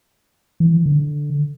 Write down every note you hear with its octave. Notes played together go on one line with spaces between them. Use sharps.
E3
D3